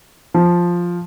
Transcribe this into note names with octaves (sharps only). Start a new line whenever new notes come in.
F3